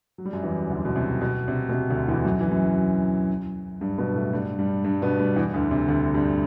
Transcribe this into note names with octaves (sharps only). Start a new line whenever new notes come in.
F#3
G3
F#2 F#3
E2 E3
D2 D3
B2
C3
B2
C3
B2
C3
D2 D3
E2 E3
F#2 F#3
E3
F#2 F#3
G2 G3
B2 B3
A2 A3
G2 G3
G2 G3
G2 G3
B2 B3
G2 G3
E2 E3
D2 D3
C3
D2 D3
G2 G3